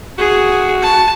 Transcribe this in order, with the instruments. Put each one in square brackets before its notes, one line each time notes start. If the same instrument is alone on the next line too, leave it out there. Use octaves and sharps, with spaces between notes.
[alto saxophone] F#4 [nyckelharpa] G#4
[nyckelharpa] A5